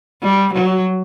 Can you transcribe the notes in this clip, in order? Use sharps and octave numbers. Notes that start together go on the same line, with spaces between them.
G3
F#3